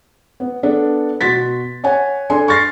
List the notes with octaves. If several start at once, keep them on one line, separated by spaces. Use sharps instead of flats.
B3
B3 D4 A4
B2 F#4 C6 A6 B6
C#5 F#5 G#5
D4 A4 G#5 C6
C#6 F6 A6 A#6 C7